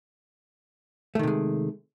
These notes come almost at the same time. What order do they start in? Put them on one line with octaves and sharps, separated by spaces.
A3 D#3 C3 G#3